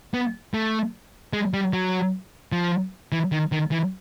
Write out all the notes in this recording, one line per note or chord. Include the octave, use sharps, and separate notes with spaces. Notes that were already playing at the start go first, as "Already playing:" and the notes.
B3
A3
G#3
G3
F#3
F3
E3
D#3
D#3
E3